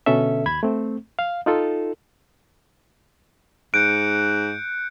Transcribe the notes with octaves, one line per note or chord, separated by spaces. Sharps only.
B2 D3 C#4 A4 E5
D#2 B5 G#6
A3 C4
F5
D#4 F4 A4
G#2 F#6 G6 C#7 D7